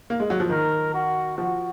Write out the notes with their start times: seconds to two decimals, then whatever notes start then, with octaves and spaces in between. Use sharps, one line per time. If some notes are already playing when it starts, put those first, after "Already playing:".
0.10 A#3
0.20 G#3
0.30 F#3
0.40 F3
0.50 D#3 A#4
0.94 F#4
1.37 F3 F#4